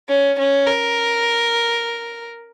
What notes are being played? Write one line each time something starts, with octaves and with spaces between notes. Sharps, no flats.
C#4
C#4
A#4